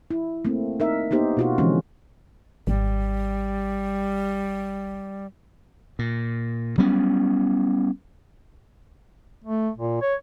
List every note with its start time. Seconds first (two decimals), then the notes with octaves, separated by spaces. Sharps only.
0.11 E4
0.45 A3 A#3 C4
0.80 D#4 A#4 E5
1.11 A#3 B3 D#4 G4 C5
1.37 B2 F4 F#4
1.58 D3 E3 F3 G#3 C4 C#4
2.67 G#1 G3
5.99 A#2
6.78 F#3 G3 B3 C#4
9.44 A3
9.78 A#2
10.02 C#5